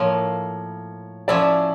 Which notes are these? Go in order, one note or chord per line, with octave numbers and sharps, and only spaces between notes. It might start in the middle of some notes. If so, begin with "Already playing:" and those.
Already playing: A2 F3 A#3 C#5
F3 C#4 E4 D5